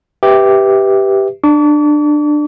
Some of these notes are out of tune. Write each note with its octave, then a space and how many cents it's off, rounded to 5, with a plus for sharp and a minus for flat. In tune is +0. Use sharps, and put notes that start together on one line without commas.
G4 +0 B4 +0 E5 -10
D4 +20 D6 -45